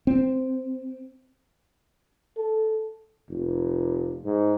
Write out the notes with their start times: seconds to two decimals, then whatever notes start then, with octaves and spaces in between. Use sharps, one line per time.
0.07 C4
2.37 A4
3.29 F1
4.25 G#2